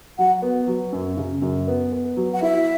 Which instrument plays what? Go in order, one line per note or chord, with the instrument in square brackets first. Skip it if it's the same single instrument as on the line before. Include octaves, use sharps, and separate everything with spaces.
[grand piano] F#3 [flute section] F#5
[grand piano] B3
F#3
F#2
C#3
F#2
B3
B3
F#3
[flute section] F#5
[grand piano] E4 [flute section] E5